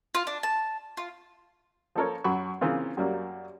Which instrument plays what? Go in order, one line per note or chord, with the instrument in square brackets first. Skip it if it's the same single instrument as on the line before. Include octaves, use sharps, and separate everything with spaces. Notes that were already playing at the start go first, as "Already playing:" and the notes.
[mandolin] F4
D4
A5
F4
[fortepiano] F3 A#3 A4 A#4 C#5
F#2 F#3 B5 C#6
C#3 E3 A#3 C4 F4
F#2 F#3 G3 A#3